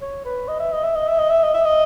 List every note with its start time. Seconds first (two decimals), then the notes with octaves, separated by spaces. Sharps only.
0.02 C#5
0.25 B4
0.48 D#5
0.60 E5
0.73 D#5
0.84 E5
0.96 D#5
1.08 E5
1.19 D#5
1.30 E5
1.43 D#5
1.54 E5
1.65 D#5